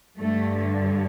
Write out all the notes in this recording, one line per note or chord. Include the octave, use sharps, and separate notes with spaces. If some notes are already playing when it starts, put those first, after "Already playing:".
G2 D3 A3